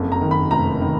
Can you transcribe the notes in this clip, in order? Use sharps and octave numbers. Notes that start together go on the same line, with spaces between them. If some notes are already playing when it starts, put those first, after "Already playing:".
Already playing: F#1 F2
A#5
D#3
B5
F1 A#5
D#3